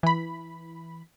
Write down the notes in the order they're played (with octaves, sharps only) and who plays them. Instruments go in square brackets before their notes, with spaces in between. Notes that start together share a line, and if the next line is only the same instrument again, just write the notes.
[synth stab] E3 B5